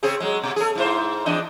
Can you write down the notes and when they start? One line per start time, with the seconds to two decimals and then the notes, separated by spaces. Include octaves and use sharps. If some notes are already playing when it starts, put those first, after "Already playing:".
0.03 C#3 C4 G#4
0.20 F#3 G#3
0.43 B2
0.56 G#4 A4
0.75 G#2 E4 C5
1.26 E2 D4 D#5